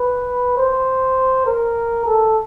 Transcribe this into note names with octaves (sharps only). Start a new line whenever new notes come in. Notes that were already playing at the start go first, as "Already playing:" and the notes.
Already playing: B4
C5
A#4
A4